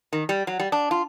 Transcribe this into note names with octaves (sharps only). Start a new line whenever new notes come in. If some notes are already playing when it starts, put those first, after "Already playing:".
D#3
G3
F#3
G3
D4
F4